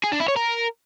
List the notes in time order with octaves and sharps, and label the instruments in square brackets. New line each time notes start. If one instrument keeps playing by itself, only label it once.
[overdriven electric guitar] G#4
D4
E4
C#5
A#4